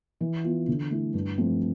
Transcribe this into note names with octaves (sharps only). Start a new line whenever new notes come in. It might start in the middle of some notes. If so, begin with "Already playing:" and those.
E3
B3 F4
D3
A3 E4
G2
F3 A3 C4